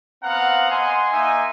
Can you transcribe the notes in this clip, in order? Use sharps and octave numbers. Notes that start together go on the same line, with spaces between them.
B3 C4 F5 F#5 A#5
D#5 F#5 G#5 C6
A#3 D#4 D#5 E5 G#5